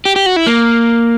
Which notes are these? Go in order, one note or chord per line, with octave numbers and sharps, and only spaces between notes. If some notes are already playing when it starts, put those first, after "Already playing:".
G4
G4
F#4
E4
A#3